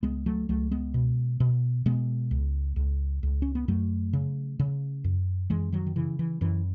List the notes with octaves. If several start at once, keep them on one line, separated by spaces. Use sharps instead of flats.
C#2 G#3 B3
F#3 A3
C#2 F#3 A3
G#3 B3
B2
B2
B2 G#3 B3
C#2
C#2
C#2
C#4
B3
F#2 F#3 A3
C#3
C#3
F#2
F#2 E3 G#3
D#3 F#3
D#3
C#3 E3
E3
F#2 E3